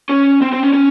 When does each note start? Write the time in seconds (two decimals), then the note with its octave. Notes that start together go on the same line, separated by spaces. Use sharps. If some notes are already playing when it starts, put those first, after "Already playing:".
0.09 C#4
0.42 C4
0.53 C4
0.63 C#4
0.73 C#4